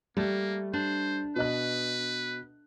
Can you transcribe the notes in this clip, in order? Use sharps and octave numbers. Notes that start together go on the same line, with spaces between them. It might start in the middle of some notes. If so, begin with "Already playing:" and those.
G3 A3 A#3
D4 C5
B2 B4 D#5 F#6